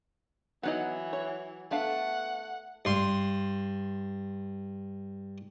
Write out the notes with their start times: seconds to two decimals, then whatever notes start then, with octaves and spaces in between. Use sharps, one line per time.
0.63 E3 F#3 B3 D#4 D#5 F#5
1.13 C#5
1.71 A3 B3 D4 F5 F#5
2.85 G2 C6